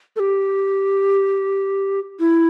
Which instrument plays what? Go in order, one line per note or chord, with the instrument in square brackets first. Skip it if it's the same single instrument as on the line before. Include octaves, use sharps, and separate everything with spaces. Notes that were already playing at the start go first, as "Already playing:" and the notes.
[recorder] A4
G4
E4